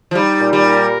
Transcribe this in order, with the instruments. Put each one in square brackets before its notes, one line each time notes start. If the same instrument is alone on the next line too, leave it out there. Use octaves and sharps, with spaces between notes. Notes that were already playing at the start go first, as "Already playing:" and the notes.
[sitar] F3
[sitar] G3 [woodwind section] D#4
[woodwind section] A#2
[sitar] G3
[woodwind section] A#4